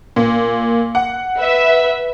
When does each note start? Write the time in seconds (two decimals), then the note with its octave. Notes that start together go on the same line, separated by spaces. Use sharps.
0.16 A#2
0.95 F#5
1.38 B4 E5